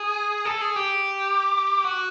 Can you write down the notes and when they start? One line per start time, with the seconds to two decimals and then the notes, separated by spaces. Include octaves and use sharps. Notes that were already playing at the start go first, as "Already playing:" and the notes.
Already playing: G#4
0.45 A4
0.61 G#4
0.76 G4
1.84 F#4